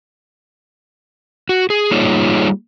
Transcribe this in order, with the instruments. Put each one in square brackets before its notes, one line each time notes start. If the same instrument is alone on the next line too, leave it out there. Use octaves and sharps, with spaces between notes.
[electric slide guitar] F#4
G#4
G3 A#3 D#4 F4 G#4 C#5